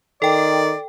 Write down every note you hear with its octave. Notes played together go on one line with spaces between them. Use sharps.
D#3 A4 D5 G5